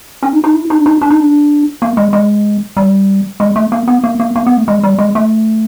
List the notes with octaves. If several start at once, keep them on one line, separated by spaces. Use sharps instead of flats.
C#4
D#4
D#4
E4
D#4
D4
D#4
D4
D#4
D4
A#3
G#3
G#3
G3
G#3
A3
A#3
B3
A#3
A#3
A#3
B3
A3
G#3
G3
G#3
A3